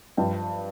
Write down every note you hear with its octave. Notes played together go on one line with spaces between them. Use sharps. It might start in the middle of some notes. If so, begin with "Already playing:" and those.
G2 F3 G5